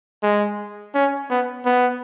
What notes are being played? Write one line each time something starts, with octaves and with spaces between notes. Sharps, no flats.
G#3
C#4
B3
B3